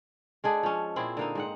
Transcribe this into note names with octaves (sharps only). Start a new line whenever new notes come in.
G#3 D4 G#4 A4
F3 C#4
A#2 C4 E4 G#4
D3 A#3 D#4
G#2 C4 F#5